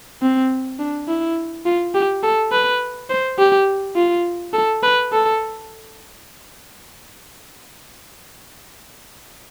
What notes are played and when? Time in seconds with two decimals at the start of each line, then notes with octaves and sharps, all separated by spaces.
0.22 C4
0.79 D4
1.08 E4
1.66 F4
1.95 G4
2.23 A4
2.52 B4
3.10 C5
3.38 G4
3.96 F4
4.53 A4
4.83 B4
5.12 A4